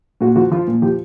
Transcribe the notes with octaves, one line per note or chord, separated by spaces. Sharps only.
A#2 F#4
F3 F#4
F3 F4
A#2
F3 G4